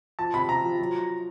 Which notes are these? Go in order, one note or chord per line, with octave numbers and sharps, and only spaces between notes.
F3 A5
C3 B5
C3 A#5
F3
F#3